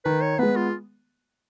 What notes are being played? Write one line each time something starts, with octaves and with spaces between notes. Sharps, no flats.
D#3 B4
C#5
G#3 B3 B4
F4